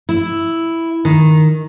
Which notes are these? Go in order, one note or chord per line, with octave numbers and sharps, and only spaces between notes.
E4
D#3